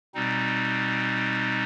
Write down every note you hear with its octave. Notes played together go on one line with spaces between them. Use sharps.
B2 G3 C4 D#4